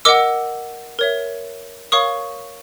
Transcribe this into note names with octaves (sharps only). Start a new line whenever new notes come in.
A#4 D#5 F#5 D6 E6
A#4 C#5 E5
A#4 C#5 F5 C#6 D#6